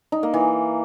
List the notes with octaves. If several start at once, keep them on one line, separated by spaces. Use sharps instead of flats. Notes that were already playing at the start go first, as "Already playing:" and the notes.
D#4
A#3
E3